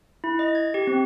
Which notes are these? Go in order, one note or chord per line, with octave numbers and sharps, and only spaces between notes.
E4
D#5
G#6
G4
C4